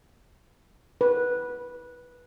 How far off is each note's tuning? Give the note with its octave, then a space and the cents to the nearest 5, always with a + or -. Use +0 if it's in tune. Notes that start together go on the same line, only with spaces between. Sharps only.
B4 -10